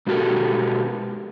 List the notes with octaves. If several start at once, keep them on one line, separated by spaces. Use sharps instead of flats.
B2 G#3 F#4 G4 A4 A#4